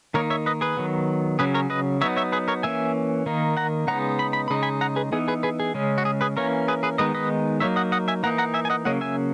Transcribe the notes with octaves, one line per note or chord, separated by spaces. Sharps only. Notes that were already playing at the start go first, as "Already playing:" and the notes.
D#3 A#3 D#4 A#4 C#5
C#5 E5
B4 D#5
G#4 B4
D#3 F#3 B3
C#3 F#3 C#4 G#4 B4
A#4 C#5
B4 D#5
F#3 B3 D#4 C#5 E5
C#5 E5
G#4 B4
A#4 C#5
E3 A#3 C#4 E5 G#5
D#3 A#3 D#4
F#5 A#5
C#3 G#3 B3 D#4 F#5 A#5
B5
B5
B5
C#3 G#3 D#4
G#5 B5
F#5 A#5
G#4 B4
E3 B3 D#4 G#4
G#4 B4
G#4 B4
G#4
C#3 G#3 C#4
F#4
G#4
G#4 B4
E3 A#3 C#4 A#4 C#5
G#4 B4
G#4 B4
D#3 G#3 B3 D#4 B4 D#5
B4 D#5
F#3 A#3 D#4 C#5 E5
D#5 F#5
D#5 F#5
E5 G#5
E3 A#3 D#4 F#5 A#5
F#5 A#5
E5 G#5
G#5
D#5 F#5
C#3 F#3 A#3 C#4 D#5 F#5
E5 G#5